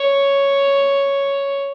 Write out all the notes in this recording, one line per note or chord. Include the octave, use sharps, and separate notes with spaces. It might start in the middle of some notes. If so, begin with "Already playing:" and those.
Already playing: C#5